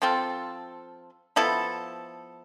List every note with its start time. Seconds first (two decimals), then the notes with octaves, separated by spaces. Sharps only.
0.02 F3 C4 F4 A4
1.36 F3 B3 E4 A4